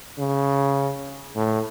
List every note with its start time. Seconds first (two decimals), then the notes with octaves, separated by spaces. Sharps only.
0.19 C#3
1.36 A2